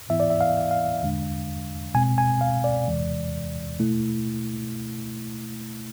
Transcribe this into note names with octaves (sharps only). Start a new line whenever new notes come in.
G#2 E3 B3 E4 E5
D5
E5
F5
F5
E2 D3 G#3 D4
B2 G#3 C4 G#5
G#5
F5
D5
E2 C3 E3 G#3
B2 A3 E4